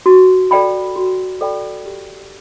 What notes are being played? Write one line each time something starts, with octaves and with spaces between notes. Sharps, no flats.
F#4
A4 D5 G5 B5
F#4
A4 D5 G5 B5
G4